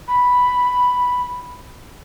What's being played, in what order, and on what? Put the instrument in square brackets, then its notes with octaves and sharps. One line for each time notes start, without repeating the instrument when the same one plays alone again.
[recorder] B5